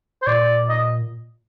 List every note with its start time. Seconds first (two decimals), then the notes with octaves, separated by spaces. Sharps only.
0.22 C5
0.27 A#2 D5
0.69 D#5